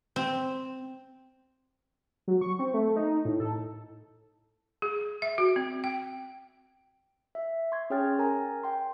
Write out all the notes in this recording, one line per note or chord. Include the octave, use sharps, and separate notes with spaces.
C4
F#3
C#6
C4
A3
D#4
A2
A4
G#4
E5
F#4
C4
G5
E5
C6 C#6 G#6
C#4 G#4 C#5 G5 F6 A6
A#4 G#5 A#5
G5 C6